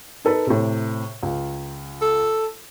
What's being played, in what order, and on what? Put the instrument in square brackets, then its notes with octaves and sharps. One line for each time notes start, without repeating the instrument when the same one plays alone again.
[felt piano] D#4 A4 B4
A2 C3
C#2
[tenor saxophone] A4